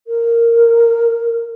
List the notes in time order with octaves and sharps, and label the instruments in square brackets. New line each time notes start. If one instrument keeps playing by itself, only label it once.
[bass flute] A#4